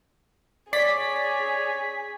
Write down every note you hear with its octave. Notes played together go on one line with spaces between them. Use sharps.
G#4 C#5 D5 B6